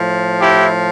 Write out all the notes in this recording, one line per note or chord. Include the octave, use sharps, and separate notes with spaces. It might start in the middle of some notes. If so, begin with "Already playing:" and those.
Already playing: A2 F3
E4 G4